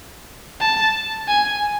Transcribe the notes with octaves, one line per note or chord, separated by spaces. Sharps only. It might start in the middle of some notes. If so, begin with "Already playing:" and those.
A5
G#5